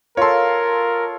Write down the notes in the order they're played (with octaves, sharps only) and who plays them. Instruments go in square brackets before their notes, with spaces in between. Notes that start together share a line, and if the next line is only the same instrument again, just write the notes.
[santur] F4 A4 [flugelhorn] A#4 [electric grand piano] C#5 C6